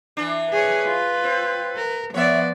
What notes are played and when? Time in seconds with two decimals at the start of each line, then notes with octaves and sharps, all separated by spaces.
0.17 E3 D4
0.53 G#4 B4 C#5
0.87 F4
1.24 C4
1.76 A#4
2.14 F3 B3 C#5 D5 E5